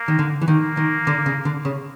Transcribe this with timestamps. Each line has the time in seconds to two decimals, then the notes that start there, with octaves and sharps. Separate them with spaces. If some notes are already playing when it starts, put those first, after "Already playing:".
Already playing: A#3
0.08 D#3
0.19 D3
0.42 E3
0.48 D#3 A#3
0.77 D#3
1.07 D3
1.26 C#3
1.45 D3
1.65 C#3